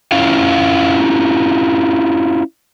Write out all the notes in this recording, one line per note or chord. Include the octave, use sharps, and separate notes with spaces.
C#4 E4 F4 F5